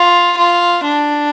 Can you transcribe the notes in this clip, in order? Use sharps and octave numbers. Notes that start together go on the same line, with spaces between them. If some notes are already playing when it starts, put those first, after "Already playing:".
Already playing: F4
F4
D4